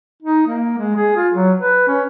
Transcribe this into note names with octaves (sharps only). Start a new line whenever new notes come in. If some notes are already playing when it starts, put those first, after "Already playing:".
D#4
A#3
G#3
G#4
F4
F#3
B4
C#4